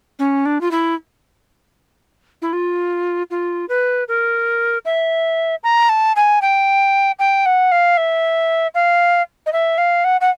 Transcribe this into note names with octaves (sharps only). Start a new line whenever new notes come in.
C#4
D4
F4
E4
E4
F4
F4
B4
A#4
E5
A#5
A5
G#5
G5
G5
F#5
F5
E5
F5
D#5
E5
F5
F#5
F#5